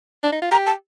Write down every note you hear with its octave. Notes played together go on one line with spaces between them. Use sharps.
D4
D#4
F4
G4 A#5
A5